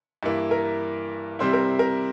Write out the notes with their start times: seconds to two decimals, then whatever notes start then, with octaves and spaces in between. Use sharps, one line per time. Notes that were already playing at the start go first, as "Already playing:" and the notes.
0.23 G2 E3 A#3 E4
0.51 A#4
1.39 C3 G3 C4 E4 C5
1.53 A#4
1.79 A#4